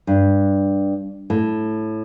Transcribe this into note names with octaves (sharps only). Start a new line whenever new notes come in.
G2
A2